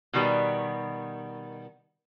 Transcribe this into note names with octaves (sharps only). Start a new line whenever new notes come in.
B2 D#3 G3 B3